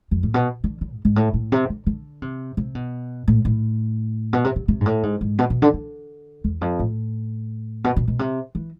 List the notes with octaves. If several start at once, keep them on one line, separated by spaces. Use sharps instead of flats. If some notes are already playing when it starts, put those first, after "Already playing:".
F2
A2
B2
D3
D3
G#2
G#2
A2
A2
C3
D3
D3
C3
C3
B2
A2
A2
B2
C3
C3
C3
G#2
A2
G#2
G#2
B2
B2
D3
D3
E2
F2
A2
B2
B2
B2
C3
E3